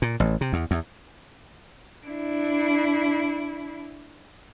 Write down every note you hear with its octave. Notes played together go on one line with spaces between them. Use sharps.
A#2
A1
C3
E2
E2
D4 E4